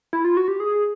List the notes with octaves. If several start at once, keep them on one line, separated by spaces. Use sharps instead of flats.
E4
F4
F#4
G4
G#4